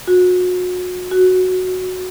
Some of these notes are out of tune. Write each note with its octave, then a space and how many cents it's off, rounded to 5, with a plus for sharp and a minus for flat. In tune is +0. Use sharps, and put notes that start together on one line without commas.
F#4 -35
F#4 -5